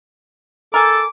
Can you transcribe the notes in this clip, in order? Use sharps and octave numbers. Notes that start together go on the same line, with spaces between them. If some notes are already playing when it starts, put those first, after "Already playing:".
A4 A#4 G#5 D6